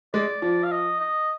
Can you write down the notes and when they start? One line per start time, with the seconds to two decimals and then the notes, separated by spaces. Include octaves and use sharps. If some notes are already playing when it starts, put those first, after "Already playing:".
0.14 G#3 D5
0.42 F3 D5
0.63 F5
0.71 D#5
1.00 D#5